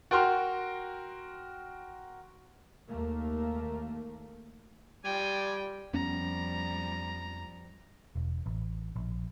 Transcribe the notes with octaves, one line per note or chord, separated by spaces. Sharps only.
F#4 A#4 G5 C6 F6
D#2 A3 A#3
F3 G3 D5 G5 G#5
F2 F3 G3 B3 C#4 A#5
E1
A1
A#1